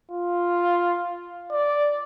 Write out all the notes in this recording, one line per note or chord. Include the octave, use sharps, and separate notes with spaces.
F4
D5